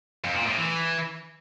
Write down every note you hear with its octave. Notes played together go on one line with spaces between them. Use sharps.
F2
A#2
A2
E3